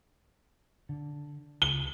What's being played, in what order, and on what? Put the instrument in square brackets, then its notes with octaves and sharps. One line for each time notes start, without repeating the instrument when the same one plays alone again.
[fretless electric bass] D3
[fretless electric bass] C#2 [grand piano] G7